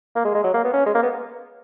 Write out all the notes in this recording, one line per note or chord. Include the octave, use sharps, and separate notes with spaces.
A#3
G#3
G#3
F#3
A#3
B3
C#4
G#3
A#3
B3